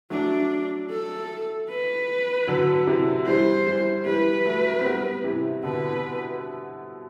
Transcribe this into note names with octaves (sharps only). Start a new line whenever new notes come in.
F#3 A3 D4
A4
B4
D3 F#3
C3 E3
E3 G3 C5
E3 G3
E3 G3 B4
F#3 A3
C4
G3 B3
C3 E3
B2 D3 B4